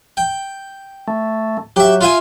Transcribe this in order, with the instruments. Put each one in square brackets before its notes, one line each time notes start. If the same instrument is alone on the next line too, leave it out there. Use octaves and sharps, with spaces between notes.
[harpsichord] G5
[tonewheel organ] A3
[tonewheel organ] F#3 [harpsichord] G4 E5
[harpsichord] F4 E5 G#5